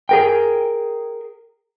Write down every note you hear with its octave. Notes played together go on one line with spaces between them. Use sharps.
G#4 A#4 G5